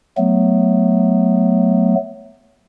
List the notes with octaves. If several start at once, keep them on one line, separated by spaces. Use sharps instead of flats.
F#3 A3 B3